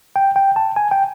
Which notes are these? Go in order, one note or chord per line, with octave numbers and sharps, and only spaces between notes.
G5
G5
A5
G#5
G5